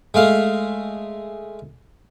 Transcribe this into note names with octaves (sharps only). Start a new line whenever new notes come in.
G#3 A3 F5